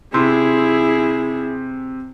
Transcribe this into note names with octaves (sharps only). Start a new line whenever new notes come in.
C3 E4 G#4 C6